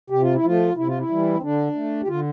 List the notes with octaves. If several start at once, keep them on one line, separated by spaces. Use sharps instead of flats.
C3 G4
F4
E4
F3 A3 F4
C3 E4
F4
E4
E3 G3
C4
D3 D4
A3
G4
D3 F4